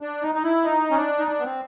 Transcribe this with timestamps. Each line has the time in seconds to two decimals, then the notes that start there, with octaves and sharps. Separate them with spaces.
0.01 D4
0.22 D#4
0.35 D#4
0.44 E4
0.64 D#4
0.91 C#4
0.96 D4
1.18 D#4
1.27 D4
1.39 B3
1.44 C4